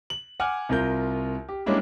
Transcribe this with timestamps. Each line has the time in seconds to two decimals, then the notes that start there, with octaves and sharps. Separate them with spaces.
0.10 F#7
0.40 F#5 G#5 D6 F6
0.69 C2 F4 A#4 G6
1.49 G4
1.66 G3 G#3 A#3 C#4 D4 E4